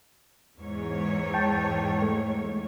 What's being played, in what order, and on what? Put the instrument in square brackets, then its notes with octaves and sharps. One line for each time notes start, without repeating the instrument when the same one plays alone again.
[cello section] E2 G#2 C#5
[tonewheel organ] G5 A5
A3